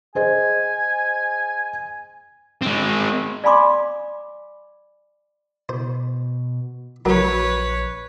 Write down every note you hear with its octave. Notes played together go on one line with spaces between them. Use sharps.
G#4 C5 D#5 G#5
G#3 C4
D5 F5 G#5 B5 C6 D6
B2 C5
A#1 F#3 A#4 B4 C#5